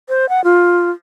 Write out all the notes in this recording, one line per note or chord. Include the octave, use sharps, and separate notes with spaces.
C5
F#5
F4